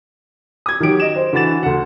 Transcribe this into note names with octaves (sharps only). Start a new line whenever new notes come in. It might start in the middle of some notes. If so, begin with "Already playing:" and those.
D#6 G#6
D#3 F#3 G4 D7
D#5 E7
C5
D3 E3 F#4 A6 E7
D2 F#5